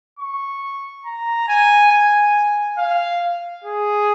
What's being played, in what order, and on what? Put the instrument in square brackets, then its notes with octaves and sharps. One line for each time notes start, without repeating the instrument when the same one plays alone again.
[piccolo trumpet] C#6
A#5
G#5
G#5
F5
G#4